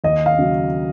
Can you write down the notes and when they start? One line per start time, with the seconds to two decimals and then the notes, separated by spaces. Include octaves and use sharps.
0.04 D#2 D#5
0.26 F5
0.38 C#3 F#3